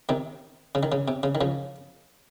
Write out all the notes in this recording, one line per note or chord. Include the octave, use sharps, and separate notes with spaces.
C3 D#3
C#3
D#3
C#3
C3
C#3
D#3
C#3 F3